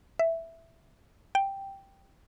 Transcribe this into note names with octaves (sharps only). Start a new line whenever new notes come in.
E5
G5